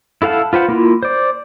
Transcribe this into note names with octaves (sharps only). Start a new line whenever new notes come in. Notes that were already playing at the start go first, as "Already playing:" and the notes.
E4 A4 F5 F#5 A5
F4 B4 C5 F#5
A#3 E4 F4
C5 D5